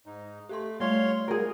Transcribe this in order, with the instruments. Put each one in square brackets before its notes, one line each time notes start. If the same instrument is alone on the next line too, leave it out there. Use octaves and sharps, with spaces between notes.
[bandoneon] G#2 D#4
[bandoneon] A3 [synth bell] G4 A4 C6
[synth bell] G3 A3 D5 [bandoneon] C#5 F5 C6
[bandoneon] C3 [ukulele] G#4 A#4